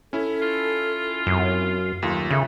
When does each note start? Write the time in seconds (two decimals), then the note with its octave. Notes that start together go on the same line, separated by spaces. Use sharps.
0.13 C#4 E4 A4
0.42 F4
1.27 F#2 C4
2.02 D#2 F#3 A3 F4
2.31 C#3 A4 E5